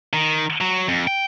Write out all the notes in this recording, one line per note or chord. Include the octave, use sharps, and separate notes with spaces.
D#3
F#3
F2
G5